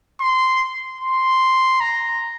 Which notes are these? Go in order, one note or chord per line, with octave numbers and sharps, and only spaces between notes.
C6
C6
A#5